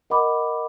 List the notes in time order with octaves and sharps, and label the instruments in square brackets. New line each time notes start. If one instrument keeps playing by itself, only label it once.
[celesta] A#4 D#5 F#5 B5 D6